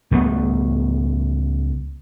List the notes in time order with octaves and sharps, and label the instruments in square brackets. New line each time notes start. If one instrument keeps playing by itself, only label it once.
[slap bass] C#2 G3 A3 B3